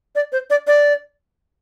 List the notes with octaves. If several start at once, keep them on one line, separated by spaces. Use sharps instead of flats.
D5
C5
D5
D5